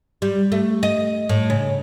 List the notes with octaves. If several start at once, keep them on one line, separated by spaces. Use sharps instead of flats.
G3
A3
D#5
A2
C#3